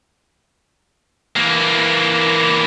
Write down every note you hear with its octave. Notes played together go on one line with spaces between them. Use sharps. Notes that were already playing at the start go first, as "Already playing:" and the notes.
E3 A#3